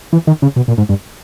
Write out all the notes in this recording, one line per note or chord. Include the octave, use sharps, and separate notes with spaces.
E3
D#3
C#3
B2
A#2
G#2
G2